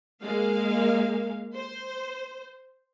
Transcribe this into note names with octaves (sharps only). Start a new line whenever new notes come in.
G#3 A#3 F5
C5